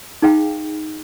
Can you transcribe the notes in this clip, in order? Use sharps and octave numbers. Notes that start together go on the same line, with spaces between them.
D#4 G#4 F5 G5